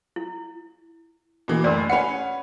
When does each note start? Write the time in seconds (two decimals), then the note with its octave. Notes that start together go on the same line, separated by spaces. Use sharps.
0.16 E4
1.48 B2 E3 A#3
1.64 F#1 D2 A#4 D5
1.90 C#4 B4 F#5 C#7